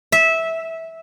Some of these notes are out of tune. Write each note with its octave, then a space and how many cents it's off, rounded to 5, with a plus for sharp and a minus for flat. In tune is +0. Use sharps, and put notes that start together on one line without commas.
E5 -15